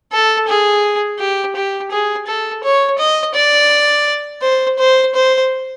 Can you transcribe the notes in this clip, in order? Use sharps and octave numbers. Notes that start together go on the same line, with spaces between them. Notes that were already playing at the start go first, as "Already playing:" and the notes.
A4
G#4
G4
G4
G#4
A4
C#5
D#5
D5
C5
C5
C5